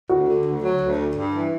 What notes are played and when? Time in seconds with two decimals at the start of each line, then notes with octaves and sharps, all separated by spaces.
0.09 D2 F#4
0.27 D3
0.44 D2
0.62 F#3
0.80 D2
0.97 D3
1.15 G2
1.33 E3